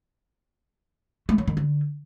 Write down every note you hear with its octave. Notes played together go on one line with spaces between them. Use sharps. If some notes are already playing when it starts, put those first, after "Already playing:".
A3
F#3
D#3
D3